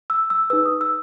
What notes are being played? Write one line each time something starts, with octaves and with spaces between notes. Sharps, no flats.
E6
E6
D#4 G#4 B4 E6
D#6
E6